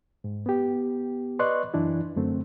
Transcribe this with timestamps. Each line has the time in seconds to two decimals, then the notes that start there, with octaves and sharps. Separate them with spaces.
0.24 G#2
0.46 B3 G4
1.39 B4 D5 D#5 C6 C#6 F#6
1.74 F#2 E3 D4 E4
2.17 F#2 D3 A3 C4